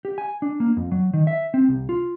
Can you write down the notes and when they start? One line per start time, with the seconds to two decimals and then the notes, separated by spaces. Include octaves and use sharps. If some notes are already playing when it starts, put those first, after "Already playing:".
0.05 G4
0.18 G#5
0.42 D4
0.60 A#3
0.77 F2
0.92 F#3
1.14 D#3
1.27 E5
1.54 C4
1.69 C2
1.89 F4